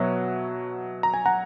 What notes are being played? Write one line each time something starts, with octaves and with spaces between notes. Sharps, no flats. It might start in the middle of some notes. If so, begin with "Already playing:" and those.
Already playing: B2 F#3 B4 C#5 E5 F#5
A#5
G#5
F#5 A#5